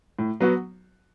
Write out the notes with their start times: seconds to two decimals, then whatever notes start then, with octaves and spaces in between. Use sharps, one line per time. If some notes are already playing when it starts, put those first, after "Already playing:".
0.19 A2
0.40 F#3 B3 F#4